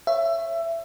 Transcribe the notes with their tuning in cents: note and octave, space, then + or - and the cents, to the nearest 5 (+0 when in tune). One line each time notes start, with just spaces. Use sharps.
C#5 -15 E5 +20